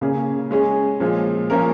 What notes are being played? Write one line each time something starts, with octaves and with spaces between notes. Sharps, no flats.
C#3 A#3 C#4 G#4
G#3 C#4 G#4
A#2 F3 G#3
A#2 F3 C#4 A#4